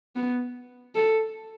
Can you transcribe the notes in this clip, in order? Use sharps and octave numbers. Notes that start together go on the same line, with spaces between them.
B3
A4